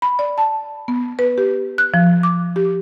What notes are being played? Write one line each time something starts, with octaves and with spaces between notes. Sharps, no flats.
B5
D5
A5
B3
B4
G4
F#6
F3
D6
G4